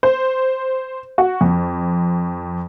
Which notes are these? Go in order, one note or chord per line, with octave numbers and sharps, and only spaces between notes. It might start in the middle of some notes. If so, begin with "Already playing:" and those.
C5
F#4
F2